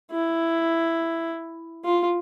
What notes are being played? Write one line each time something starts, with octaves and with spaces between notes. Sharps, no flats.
E4
F4